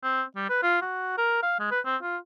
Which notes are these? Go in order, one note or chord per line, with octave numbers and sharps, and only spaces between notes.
C4
G3
B4
F4
F#4
A#4
F5
G#3
B4
C4
F4